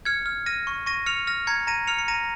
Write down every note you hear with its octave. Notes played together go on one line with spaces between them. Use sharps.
F6 G#6 C#7
F6
F6 A#6 D#7
C#6
C#6 A#6 D#7
F6 C#7 F7
F6 A#6
A#5 G#6 C#7
A#5 A#6 D#7
F6 C#7 F7
C#7
A#5 A#6 D#7